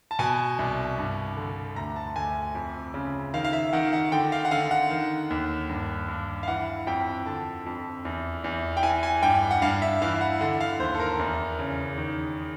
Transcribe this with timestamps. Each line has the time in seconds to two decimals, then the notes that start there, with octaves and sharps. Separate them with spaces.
0.11 A5
0.19 B2 G#5
0.59 C2
0.98 G2
1.37 D3
1.76 D2 A#5
1.96 A5
2.16 D2 G#5
2.55 F2
2.94 C#3
3.34 D#3 F5
3.44 F5
3.53 E5
3.73 D#3 F#5
3.93 F#5
4.12 D3 G5
4.32 F5
4.45 F#5
4.51 D3 F5
4.71 F#5
4.91 D#3
5.30 D#2
5.69 G2
6.09 G2
6.43 F5
6.48 E3 F#5
6.87 F2 G5
7.26 D3 A5
7.66 F2
8.05 E2
8.44 E2
8.77 G5
8.83 E3 G#5
9.03 G#5
9.23 G2 G5
9.51 F#5
9.62 G2 F5
9.82 E5
10.02 E3 F5
10.21 F#5
10.41 D3 F#5
10.61 F5
10.80 D#2 C5
10.95 A4
11.00 A#4
11.19 E2
11.59 C#3
11.97 D#3